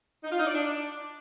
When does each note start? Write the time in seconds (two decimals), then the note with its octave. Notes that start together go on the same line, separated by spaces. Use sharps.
0.24 D#4
0.32 F4
0.39 D#4
0.47 D5
0.54 D4